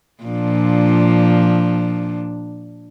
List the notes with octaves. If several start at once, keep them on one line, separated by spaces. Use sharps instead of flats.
A#2 F3 D4